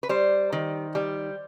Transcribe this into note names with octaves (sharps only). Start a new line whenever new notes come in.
B4
G3 C5
D#3
G3